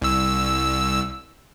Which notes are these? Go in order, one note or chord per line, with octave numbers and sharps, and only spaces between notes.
C2 E6